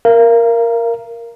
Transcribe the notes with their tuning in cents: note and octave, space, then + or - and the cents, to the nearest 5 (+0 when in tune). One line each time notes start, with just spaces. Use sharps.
A#4 +0 F5 -35